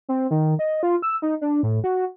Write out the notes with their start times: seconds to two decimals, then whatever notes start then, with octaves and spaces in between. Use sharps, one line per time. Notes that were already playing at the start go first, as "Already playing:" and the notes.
0.09 C4
0.31 D#3
0.59 D#5
0.83 F4
1.02 E6
1.22 D#4
1.41 D4
1.63 A2
1.84 F#4